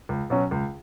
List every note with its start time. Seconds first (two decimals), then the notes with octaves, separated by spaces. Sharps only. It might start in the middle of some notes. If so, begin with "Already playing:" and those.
0.09 C#2
0.30 B2 F#3 C#4
0.51 C#2